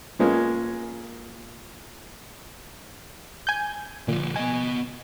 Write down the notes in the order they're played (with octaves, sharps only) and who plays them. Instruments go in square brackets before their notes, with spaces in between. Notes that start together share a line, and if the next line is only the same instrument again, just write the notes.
[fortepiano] A#2 F3 G#3 A#3 B3 C#4
[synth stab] G#5 G6
[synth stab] A#2 [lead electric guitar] D3 F3
[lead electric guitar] B3 D#5 [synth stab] G#5